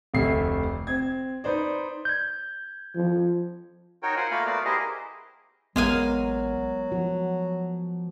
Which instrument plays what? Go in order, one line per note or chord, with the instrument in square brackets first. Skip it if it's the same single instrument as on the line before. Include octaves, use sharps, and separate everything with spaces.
[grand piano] F1 D2 A3 E5 C7
C4 G#6
D#4 B4 C5 D5
[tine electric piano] G6 G#6
[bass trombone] F3
[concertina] D#4 F#4 A#4 C#5 G5
F4 C5 F#5 G#5
A3 A#3 F4 A#4 F5 B5
A3 B3 F#4 D5 F5
E4 G4 G#4 A#4 C5 D#5
[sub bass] A1 [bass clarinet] F#3 [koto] G#3 F5 G#5 [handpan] B3 A#4
[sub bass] F3 [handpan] F#4